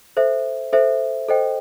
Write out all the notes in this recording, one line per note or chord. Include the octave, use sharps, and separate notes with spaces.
A4 C5 E5
A4 C5 E5
A4 C5 D#5 G5